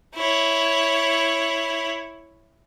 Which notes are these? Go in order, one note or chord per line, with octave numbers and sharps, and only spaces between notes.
E4 C#5